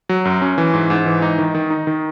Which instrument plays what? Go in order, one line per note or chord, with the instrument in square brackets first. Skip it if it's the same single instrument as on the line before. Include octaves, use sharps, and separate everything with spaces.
[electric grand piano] F#3
F#2
C#4
E3
G#2
G#2
E3
D#4
D#3
D#3
D#4
D#3